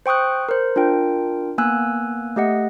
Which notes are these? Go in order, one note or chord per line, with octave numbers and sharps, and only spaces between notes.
C5 G5 C#6 D#6 F#6
A#4 C5
D4 F4 A#4 G5
A#3 B3 G#5 E6 F#6
A3 G4 D#5 F#5